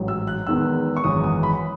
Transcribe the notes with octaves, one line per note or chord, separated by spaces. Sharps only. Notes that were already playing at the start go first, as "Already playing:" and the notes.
Already playing: A1 G#2 F#3
E6
F#6
E2 D#3 G#3 B3 E6
C#6
G#1 F#2 E3 G#3 D#6
D#6
B5